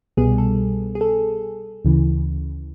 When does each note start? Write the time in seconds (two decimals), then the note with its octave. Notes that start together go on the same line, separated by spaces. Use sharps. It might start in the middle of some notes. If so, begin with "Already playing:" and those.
0.17 C2 B2 G3 B3 G#4
0.38 A4
0.95 G#4
1.01 A4
1.85 D2 C#3 E3